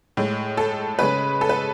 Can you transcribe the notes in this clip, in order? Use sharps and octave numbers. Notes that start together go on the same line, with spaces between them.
A2 G#3
A4
C#3 G#3 B4
A4
B4